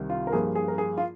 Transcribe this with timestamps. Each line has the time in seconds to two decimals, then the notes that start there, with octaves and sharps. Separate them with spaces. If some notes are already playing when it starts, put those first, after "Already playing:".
Already playing: C2 C3 D#3 G3
0.10 F4
0.27 A#4
0.32 G2 F3 A#3 G#4
0.55 G#4
0.68 A#4
0.78 G#4
0.98 F4